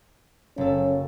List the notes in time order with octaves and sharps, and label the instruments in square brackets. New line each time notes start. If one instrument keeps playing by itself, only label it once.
[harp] F#1 A4 [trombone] C#4